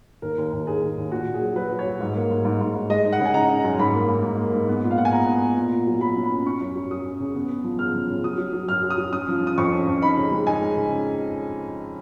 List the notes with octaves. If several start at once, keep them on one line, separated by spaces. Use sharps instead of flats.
D#2 A#4
D#2
D#2
D#2 G#4
D#2
D#2
A#2 F#4
A#2
G#4
F#3
F#3 B4
F#3
C#5
F#3
G#2
A#3
G#2
G#2
G#2
G#2
G#3 D#5
D#4
F#5
C#3
G#5
D#4 A#5
D#4
F#2
G#2 B5
A#3
G#2
G#2
A#3
G#2
B3
A#2
F5
A#2 F#5
G#5
B3 A#5
B3
B3
A#2
A#2
F#3
F#3 B5
C#4
B5
C#4
C#4 C#6
F#2
F#3
F#3 D#6
C#4
C#3
B3
B3
F3
C#3 F6
F3
C#3
F#3 D#6
F#3
F#3
F#2 F6
F#3
D#6
F#3
C#4 D#6
F3
C#4 D#6
F2 C#6
C#4
F2
D#4 B5
C#3
G#3
D#4 G#5
G#3
C#3